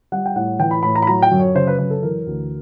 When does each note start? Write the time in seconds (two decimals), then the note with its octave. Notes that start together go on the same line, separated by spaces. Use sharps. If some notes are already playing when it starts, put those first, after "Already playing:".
0.12 G3 F#5
0.26 G5
0.36 A2 F#5
0.59 E3 G5
0.71 B5
0.83 A2 B5
0.95 A#5
1.02 B5
1.07 F#3 A#5
1.22 G5
1.32 F#2
1.40 C#5
1.55 C#3 C5
1.67 B4
1.78 F#2 B4
1.90 A4
2.03 E3 A#4
2.27 D2